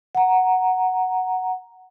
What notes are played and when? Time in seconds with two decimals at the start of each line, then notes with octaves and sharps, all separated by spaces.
0.15 F#5 A#5